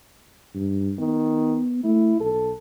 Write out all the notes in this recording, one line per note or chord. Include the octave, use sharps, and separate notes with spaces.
G2
D#3 B3
A3 E4
B1 A4